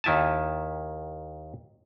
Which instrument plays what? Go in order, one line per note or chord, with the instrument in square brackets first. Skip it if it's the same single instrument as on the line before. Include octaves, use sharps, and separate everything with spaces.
[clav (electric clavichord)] D#2 D#3 E4 G#5 A5